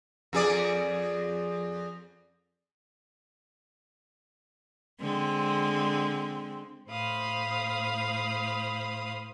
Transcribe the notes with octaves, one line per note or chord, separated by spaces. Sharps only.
F2 G#4 D5
D3 G#3 C4
A2 C5 F5 B5 D#6